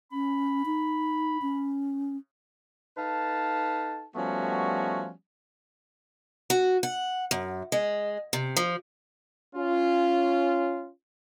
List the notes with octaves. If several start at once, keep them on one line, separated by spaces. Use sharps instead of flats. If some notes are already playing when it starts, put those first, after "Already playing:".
C#4 B5
D#4
C#4
D#4 A4 B4 F5 A5
F3 G3 A3 B3 C#4 F#4
F#4
F#5
F#2
G#3
C3
F3
C#4 F4